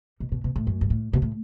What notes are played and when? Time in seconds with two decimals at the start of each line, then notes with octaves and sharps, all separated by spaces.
0.20 B2
0.32 B2
0.44 B2
0.56 A2
0.67 F#2
0.81 G2
0.90 A2
1.13 B2
1.22 A2